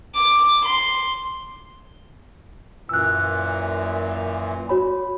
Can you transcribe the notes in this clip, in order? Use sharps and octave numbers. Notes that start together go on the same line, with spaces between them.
D6
C6
F#2 A#2 E3 E6 F#6
F#4 C#5 B5